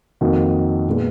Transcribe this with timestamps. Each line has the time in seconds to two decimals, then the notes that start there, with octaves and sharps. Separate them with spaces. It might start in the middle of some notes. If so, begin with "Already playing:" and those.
0.21 F2 D#3 A#3 D#4 F#4
0.88 A#2 G#3 B3